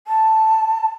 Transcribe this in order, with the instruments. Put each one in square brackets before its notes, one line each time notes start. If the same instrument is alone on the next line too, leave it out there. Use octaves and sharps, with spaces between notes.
[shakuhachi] A5